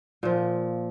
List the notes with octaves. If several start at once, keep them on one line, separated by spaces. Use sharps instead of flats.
A#2 F3